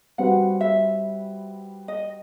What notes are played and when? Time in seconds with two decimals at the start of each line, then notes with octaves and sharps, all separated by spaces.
0.18 G3 C4 F#4 B4 F#5
0.61 E5
1.88 D#5